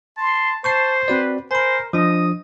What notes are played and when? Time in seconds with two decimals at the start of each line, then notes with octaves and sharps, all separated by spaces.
0.18 A5 C6
0.64 C5 A5 C#6 G6 C7
1.08 C4 F#4 B4 D5
1.51 A#4 C5 G#5 B5
1.93 F3 D4 D#5 D#6